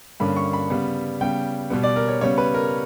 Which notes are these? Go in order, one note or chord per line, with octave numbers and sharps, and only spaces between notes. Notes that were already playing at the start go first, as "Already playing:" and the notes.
G2 D3 A#3 C#4 B5
C#6
B5
C#3 G3 B3
C#3 G3 B3 G5
B2 G3 B3
D5
A#4
C#5
C#3 G3 B3 C#5
B4
A#4